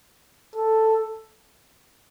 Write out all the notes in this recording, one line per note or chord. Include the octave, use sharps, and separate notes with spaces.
A4